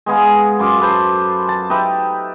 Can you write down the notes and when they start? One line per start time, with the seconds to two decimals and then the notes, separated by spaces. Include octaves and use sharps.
0.06 G#3 B3 G#4 F5
0.59 F#2 F4 C6 D6
0.80 A4 B4 C5 A5
1.48 A5
1.70 D#4 G4 B4 E5